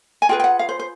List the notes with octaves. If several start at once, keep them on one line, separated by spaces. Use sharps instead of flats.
G#5
F4 G#4 B4 G5
G5
F#5
F5
C5
C5